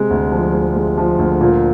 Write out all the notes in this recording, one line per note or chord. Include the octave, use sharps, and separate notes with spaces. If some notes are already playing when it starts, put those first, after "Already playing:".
Already playing: C3 G#3
D2
F3
G#3
G#3
F3
D2
A#2